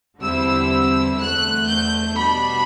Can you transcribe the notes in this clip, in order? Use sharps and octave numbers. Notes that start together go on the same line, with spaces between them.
E2 D3 G3 C4 E4 E6
E2 D3 A3 F#6
G6
B2 G3 D4 B5